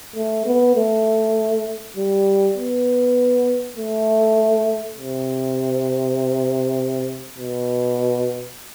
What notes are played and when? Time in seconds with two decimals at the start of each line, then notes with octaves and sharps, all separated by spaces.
0.16 A3
0.46 B3
0.76 A3
1.97 G3
2.57 B3
3.77 A3
4.98 C3
7.38 B2